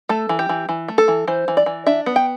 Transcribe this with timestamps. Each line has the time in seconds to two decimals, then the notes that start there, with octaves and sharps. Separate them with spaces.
0.09 A3 A4
0.29 E3
0.39 G4
0.49 E3
0.69 E3
0.88 A3
0.98 A4
1.08 E3
1.27 E3 C5
1.48 E3
1.57 D5
1.66 E3
1.86 D4 E5
2.06 B3
2.16 G5